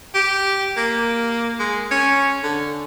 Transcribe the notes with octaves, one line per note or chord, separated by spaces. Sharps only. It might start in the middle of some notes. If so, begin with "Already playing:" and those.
G4
A#3
G#3
C#4
D3